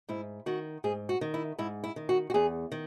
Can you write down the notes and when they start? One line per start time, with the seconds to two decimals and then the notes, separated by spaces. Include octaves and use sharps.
0.09 G#2 E4
0.46 D#3 F#4
0.84 G#2 G#4
1.09 F#4
1.21 D#3
1.34 E4
1.59 G#2 E4
1.84 E4
1.96 D#3
2.09 F#4
2.30 F#4
2.34 E2 G#4
2.72 D#3